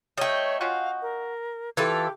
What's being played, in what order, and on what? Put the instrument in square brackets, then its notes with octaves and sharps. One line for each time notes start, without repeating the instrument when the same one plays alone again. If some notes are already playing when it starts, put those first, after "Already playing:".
[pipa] G3 A3 [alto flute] C#5 [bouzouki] D#5 G5
[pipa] C#4 F4 F#4 [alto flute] F5
[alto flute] A#4
[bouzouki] E3 F4 A4 [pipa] E4 [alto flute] G4